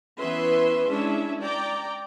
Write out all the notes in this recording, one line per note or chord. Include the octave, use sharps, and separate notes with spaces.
E3 B3 C#4 B4 E5 C6
G#3 C#4 D4 E4 E5
D5 G5 A#5